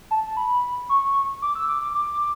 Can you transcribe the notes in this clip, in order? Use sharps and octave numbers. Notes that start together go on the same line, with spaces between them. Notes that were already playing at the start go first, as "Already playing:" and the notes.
A5
B5
C#6
D6
E6
D6
D6
D6